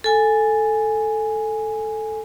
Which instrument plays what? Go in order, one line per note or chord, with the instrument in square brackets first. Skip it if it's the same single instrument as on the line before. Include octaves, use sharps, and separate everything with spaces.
[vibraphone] A4 G#5